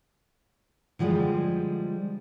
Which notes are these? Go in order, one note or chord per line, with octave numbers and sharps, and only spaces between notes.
D3 F3 G3 G#3